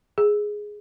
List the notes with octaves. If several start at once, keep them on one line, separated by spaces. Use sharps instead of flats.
G#4